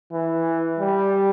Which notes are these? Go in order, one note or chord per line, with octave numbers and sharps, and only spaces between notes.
E3
G3